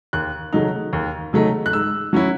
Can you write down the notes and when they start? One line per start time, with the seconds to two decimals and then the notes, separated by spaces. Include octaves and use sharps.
0.13 D#2 F#6
0.53 C#3 F#3 A3 D#4
0.93 D#2
1.33 C#3 F#3 A3 D#4
1.66 F#6
1.73 G#2 E6
2.13 F#3 C#4 E4